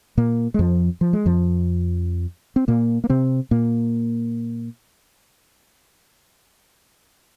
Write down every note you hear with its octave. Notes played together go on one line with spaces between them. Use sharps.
A#2 A#3
G#3
F2 F3
F3
G#3
F2 F3
C4
A#2 A#3
A#3
C3 C4
A#2 A#3